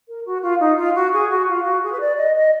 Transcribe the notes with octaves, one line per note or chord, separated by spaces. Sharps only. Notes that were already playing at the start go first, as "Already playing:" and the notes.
A#4
F#4
F4
D#4
F4
F#4
G#4
F#4
F4
F#4
G#4
B4
D5
D#5
D#5